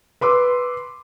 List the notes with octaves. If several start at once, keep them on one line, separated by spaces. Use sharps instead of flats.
B4 C6 D6 E6